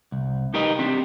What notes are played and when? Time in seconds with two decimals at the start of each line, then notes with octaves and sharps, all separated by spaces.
0.12 C2
0.54 D#4 G4 A#4 B4 D#5
0.79 C4 D4 G4